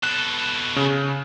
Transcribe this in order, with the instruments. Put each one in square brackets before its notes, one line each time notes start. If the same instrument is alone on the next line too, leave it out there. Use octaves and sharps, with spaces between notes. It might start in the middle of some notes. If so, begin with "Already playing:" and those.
[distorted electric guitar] B2 A4 [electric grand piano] F#6
[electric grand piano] C#3